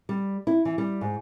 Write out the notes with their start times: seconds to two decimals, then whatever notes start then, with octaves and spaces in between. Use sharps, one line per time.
0.09 G3
0.47 E4
0.65 E3
0.78 G3
1.01 G#2